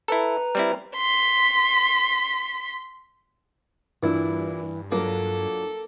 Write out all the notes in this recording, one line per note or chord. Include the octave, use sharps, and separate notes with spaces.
E4 A4 B4 A#5
G3 C4 E4
C6 B6
G2 A#2 E3 D4 E4
F#3 A#3 D4 F4 A4